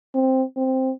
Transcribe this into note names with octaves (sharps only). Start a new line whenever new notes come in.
C4
C4